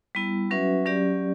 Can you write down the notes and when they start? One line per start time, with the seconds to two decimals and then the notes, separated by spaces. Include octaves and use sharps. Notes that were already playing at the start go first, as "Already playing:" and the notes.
0.15 G3 B3 E4
0.51 F#3 C#4 F#4 B4 E5
0.86 F#3 C#4 G4 D5